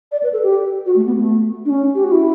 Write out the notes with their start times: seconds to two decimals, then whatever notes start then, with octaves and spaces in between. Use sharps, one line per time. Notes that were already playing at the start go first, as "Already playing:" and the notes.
0.12 D5
0.23 B4
0.33 A4
0.43 G4
0.86 F#4
0.96 A3
1.06 B3
1.18 A3
1.65 D4
1.70 C#4
1.95 G4
2.04 F#4
2.12 E4